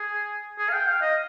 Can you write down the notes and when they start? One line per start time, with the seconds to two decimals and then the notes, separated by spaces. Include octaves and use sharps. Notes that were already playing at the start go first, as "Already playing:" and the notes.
Already playing: G#4
0.59 G#4
0.69 F5
0.74 G5
0.87 F5
1.02 D#5